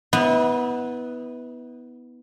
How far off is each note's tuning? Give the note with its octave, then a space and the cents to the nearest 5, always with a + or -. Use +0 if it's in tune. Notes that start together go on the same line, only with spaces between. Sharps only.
B3 +0 E4 -40